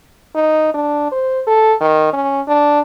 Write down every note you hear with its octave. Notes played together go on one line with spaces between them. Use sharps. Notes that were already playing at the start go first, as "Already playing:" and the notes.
D#4
D4
C5
A4
D#3
C#4
D4